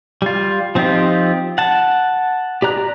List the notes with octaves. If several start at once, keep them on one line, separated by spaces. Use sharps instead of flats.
G3 F4
F3 C4 D#4 F4 G4
F#5 A5
G4 D5 A#5 F#6